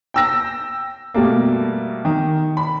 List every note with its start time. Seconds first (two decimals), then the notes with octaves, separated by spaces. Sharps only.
0.14 G5 E6 A#6
1.14 B2 G3 A3 A#3
2.05 D#3
2.57 B5